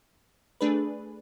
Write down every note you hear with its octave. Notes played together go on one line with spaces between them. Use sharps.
A3 D4 G#4 B4